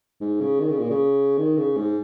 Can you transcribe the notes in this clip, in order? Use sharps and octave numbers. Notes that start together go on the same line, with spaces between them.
G#2
C#3
D#3
C#3
A#2
C#3
D#3
C#3
G#2